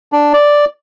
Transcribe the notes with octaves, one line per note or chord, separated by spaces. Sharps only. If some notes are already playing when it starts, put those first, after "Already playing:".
D4
D5